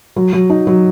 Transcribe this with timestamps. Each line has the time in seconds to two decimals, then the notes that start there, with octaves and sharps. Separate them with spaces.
0.16 F#3
0.33 F#3
0.50 D#4
0.67 F#3